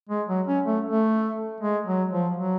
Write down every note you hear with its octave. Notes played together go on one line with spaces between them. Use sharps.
G#3
F#3
C#4
A3
A3
G#3
F#3
F3
F#3